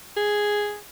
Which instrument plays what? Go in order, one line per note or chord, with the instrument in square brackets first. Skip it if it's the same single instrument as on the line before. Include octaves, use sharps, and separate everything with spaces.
[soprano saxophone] G#4